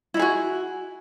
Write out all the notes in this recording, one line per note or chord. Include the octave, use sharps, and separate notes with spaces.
D#4 E4 F#4 G#4